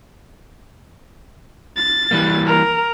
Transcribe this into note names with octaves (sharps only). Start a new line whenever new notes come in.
A6
E3 G3 A#3
A#4